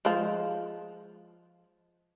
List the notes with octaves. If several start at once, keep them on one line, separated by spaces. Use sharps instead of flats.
F3 G#3